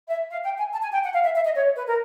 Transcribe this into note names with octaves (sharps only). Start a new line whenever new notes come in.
E5
F5
G5
G#5
A5
G#5
G5
F#5
F5
E5
E5
D#5
C#5
B4
A#4